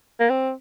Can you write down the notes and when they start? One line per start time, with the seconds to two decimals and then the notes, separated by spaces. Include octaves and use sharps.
0.20 A#3
0.30 C4